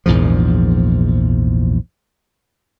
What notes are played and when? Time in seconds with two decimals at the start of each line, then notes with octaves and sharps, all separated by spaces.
0.06 A#1 E2 G#2 F3